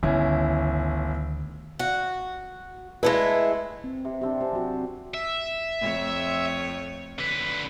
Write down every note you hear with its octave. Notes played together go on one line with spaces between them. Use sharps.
G1 D2 D#3 C#4 E4
F#4
G#3 A3 E4 B4
C4
C3
C3 C4 D4 G4
G4 C5 G#5 A5
F#3 F#4
E5
F2 A3 C#5
D3 B4